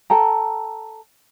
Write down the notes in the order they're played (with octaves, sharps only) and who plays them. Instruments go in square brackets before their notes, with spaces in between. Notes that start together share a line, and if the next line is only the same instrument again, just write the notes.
[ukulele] A4 G5 A#5